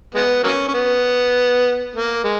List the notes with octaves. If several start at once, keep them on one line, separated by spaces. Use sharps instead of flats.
G#3 B3
F#3 A#3 C#4
C#4
B3
A#3
G#3